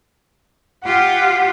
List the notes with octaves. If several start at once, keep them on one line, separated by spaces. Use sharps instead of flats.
F4 G4 F#5